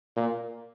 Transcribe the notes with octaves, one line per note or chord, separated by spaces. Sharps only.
A#2